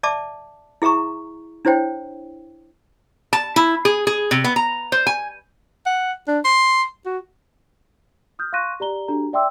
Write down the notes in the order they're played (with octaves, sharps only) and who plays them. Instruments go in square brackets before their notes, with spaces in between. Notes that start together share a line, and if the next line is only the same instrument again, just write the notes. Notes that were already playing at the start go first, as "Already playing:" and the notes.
[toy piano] D5 E5 A5 D6
E4 G#4 E5 A#5 C#6
D4 E4 C5 C#5 G5
[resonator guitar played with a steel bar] A5
E4
G#4
G#4
C3
B3
A#5
C5
G#5
[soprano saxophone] F#5
D4
C6
F#4
[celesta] D#6 F6 G6
F5 C6 C#6 F#6 A#6 D#7
G4 D5 A#5 G7
D4 F#4 G4 A4 A#5
D5 E5 G5 C6 D6 E6